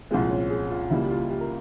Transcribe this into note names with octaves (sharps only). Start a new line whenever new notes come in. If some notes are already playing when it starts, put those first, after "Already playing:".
C2 A#2 F3 G#3 C4
C#4
G#4
F4
C#2 C#3 G3 A#3 E4
G4
F4
G4
A#4